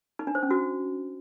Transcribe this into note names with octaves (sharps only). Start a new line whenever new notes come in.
D#4
D4
C5
C#4
F#4